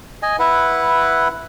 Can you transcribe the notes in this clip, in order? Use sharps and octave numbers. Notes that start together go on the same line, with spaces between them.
D#5 G#5
E4 B4 F#5